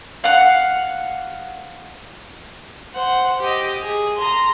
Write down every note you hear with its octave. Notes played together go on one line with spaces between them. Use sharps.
F5 F#5
C5 F#5
G4 D#5
G#4
A#5 C6